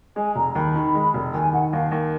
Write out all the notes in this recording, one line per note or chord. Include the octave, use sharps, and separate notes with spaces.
G#3 G#5
F1 A#5
D#2 B5
D#3
G#3
F1
D#2 G#5
D#3 F#5
D#2 F5
D#2